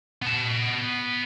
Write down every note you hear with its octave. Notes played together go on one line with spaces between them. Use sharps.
B3 A5